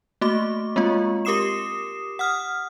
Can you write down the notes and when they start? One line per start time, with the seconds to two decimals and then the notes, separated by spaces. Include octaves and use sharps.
0.21 A3 A#3 F#4 D6
0.76 G#3 A#3 C4 F4
1.25 G4 A#4 D6 D#6 C7 E7
2.19 F#5 D#6 F6